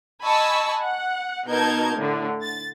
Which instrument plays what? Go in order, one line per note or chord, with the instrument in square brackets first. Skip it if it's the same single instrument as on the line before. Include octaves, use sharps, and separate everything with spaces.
[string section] D#5 G#5 A5 B5 C#6 E6
F#5
B2 D#4 A#4 A5 G6 G#6
A2 D3
A6